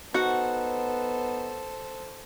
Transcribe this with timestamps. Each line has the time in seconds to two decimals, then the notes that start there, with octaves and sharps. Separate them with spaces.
0.14 B3 D#4 F#4 A4 C5 F#5